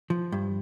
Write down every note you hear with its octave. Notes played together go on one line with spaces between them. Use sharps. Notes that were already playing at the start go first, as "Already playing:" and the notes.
F3
G2